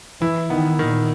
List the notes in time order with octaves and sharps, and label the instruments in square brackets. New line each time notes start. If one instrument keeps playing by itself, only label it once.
[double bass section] E3 [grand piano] E4
[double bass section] D#3 [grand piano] B3
[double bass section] A#2 [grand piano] D#3